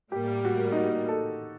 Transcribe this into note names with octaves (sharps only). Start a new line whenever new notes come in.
A2 G3 A#3 G4
F#4
D#4
F#4
A4